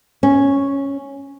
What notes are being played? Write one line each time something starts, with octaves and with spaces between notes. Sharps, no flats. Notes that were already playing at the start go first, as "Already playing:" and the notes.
C#4